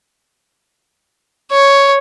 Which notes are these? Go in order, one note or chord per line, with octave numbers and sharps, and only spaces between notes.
C#5